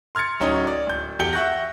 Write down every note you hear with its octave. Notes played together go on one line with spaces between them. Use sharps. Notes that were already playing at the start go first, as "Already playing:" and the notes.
C6 F6 G#6 A6 C#7
D1 F#3 C#4 D#4
D5
D1 G6
E2 G4 G6 C#7 G7
E5 F#5 C#6 F#6 G6 A#6